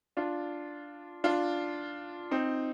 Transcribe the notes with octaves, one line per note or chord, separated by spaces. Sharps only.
D4 F4
D4 F4
C4 D#4